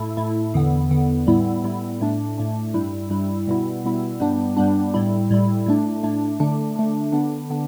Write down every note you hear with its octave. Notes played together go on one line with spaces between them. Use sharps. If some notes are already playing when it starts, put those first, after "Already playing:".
Already playing: A2 A3 E4
A2 A3 E4
E2 D3 B3
E2 D3 B3
A2 G3 B3 E4
A2 G3 B3 E4
A2 A3 D4
A2 A3 D4
G2 G3 E4
G2 G3 E4
B2 G3 B3 E4
B2 G3 B3 E4
G2 G3 B3 D4
G2 G3 B3 D4
A2 G3 E4
A2 G3 E4
A2 A3 D4
A2 A3 D4
D3 A3 D4
D3 A3 D4
D3 B3 D4
D3 B3 D4